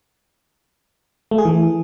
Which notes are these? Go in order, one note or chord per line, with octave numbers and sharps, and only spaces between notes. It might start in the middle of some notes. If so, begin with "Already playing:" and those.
A3
G#4
E3